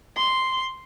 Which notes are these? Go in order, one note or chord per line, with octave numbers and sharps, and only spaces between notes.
C6